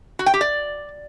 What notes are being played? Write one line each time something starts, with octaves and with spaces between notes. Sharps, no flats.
F#4
G5
G4
D5